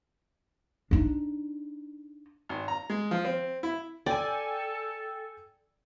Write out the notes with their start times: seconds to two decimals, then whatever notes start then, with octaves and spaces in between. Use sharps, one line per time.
0.91 D4 D#4
2.49 G#1
2.68 A#5
2.90 G#3
3.11 F3
3.25 C4
3.63 E4
4.06 A4 D5 G5 G#5